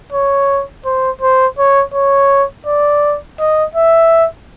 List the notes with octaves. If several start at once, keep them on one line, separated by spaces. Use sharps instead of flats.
C#5
C5
C5
C#5
C#5
D5
D#5
E5